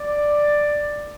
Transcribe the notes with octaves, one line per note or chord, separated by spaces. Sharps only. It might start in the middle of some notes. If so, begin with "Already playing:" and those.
Already playing: D5